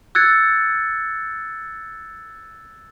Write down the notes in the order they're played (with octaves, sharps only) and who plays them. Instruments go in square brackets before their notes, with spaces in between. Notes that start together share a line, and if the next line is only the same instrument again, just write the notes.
[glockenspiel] E6 F#6 G#6 A6 C#7